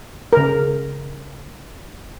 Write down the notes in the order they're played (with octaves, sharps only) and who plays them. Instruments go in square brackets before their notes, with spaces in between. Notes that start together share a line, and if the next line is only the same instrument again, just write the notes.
[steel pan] C#3 A#4